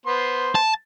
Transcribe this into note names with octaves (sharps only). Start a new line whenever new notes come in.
B3 C5 C6
A5